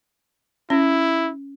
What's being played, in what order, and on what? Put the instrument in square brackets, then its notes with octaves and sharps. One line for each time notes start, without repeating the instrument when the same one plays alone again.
[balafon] C#4 [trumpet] E4